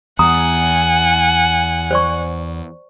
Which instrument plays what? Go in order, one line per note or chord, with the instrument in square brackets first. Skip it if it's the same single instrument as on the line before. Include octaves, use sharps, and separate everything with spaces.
[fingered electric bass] E2 [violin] F#5 G#5 [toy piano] A#5 D#6
[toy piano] C5 D5 C#6